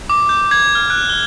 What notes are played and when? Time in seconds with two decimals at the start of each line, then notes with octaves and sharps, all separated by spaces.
0.10 D6
0.29 G6
0.51 G#6
0.75 F6
0.90 F#6
1.09 G7